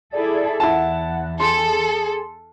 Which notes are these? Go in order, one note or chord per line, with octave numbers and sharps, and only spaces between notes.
E4 G#4 A4 D5 A5
E2 E4 F#5 A5
G#4 A4 C6